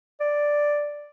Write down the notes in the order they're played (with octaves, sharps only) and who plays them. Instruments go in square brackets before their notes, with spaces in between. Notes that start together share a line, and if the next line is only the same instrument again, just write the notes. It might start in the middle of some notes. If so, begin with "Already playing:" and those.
[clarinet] D5